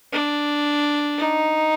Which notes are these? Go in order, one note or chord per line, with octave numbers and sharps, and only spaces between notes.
D4
D#4